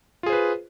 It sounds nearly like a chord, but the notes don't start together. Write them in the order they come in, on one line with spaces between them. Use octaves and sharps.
F4 G#4 C5 B4